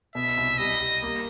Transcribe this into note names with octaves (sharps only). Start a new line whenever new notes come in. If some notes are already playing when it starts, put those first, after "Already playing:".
B2 E5
C2
G3 D#5
G3
A#3